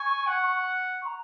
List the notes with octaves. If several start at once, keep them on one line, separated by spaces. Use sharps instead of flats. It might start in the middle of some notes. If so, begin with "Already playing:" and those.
Already playing: G#5 C#6
F#5
C#6
A#5